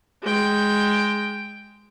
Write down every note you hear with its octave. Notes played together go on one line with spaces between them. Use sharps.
G#3 G5